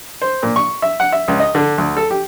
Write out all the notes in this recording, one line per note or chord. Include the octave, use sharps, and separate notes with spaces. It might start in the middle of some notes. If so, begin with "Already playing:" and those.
C5
A#2
C#6
E5
F#5
E5
C#2
D#5
D3
D2
A4
G4